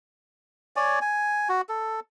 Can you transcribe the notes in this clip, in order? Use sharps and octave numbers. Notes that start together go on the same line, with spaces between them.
C#5 D5 G#5
G#5
F#4
A4